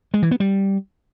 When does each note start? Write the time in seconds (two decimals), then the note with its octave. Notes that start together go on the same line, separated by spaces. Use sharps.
0.14 G#3
0.22 E3
0.31 B3
0.40 G3